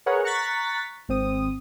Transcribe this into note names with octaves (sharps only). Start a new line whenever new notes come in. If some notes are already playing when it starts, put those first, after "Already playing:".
G#4 A#4 B4 C#5 F#5
A#5 C#6 F#6 A6 B6
G#1 C4 D#6